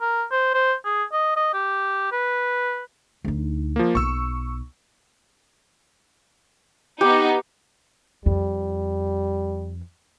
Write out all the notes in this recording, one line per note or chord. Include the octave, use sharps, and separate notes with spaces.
A#4
C5
C5
G#4
D#5
D#5
G4
B4
D2 D#4
F3 A#3
B1 C#6 E6
B3 D#4 G4
F2 G3